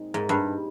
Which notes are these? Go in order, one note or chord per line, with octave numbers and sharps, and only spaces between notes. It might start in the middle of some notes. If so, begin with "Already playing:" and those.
Already playing: A#2 G#3 C4 D#4
G#2
G2